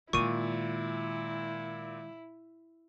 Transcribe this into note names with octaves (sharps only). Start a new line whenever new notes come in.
A#2 D#3 G#3 E4 C#6 D#7